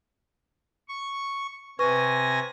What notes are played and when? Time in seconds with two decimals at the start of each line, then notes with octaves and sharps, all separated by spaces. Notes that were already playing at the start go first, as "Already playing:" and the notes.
0.89 C#6
1.79 C3 B4 G#5 C#6 A#6